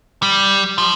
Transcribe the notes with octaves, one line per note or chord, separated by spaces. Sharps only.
G3
F3